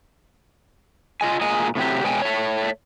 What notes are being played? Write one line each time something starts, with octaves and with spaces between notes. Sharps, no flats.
F4 D#5 G#5
A#2 G#3 D#5 G#5
A2 C3 F#3 G4
B2 G#3 C#5 G5 G#5
A3 C#5